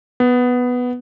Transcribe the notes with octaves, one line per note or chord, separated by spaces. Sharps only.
B3